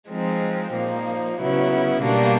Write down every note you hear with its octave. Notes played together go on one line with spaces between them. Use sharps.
F3 G#3 C4 D#4
A#2 F3 A#3 D#4
C#3 F#3 B3 E4
B2 G3 A#3 D4